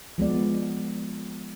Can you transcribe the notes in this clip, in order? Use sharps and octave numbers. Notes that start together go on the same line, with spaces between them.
F3 G#3 B3 D5